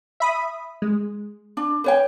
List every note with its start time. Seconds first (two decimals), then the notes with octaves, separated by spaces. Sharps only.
0.20 E5 B5 D#6
0.82 G#3
1.57 D4
1.84 B4 C#5 G5